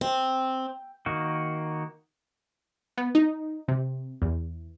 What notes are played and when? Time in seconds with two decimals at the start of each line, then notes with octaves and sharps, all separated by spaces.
0.01 C4
1.06 D#3 A#3 F#4
2.97 B3
3.15 D#4
3.68 C3
4.22 E2